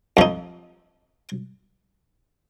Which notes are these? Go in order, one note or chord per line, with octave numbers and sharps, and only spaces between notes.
F2 F3 D#4